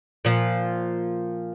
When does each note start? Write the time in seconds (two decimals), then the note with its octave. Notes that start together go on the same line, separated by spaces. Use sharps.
0.25 A#2 F3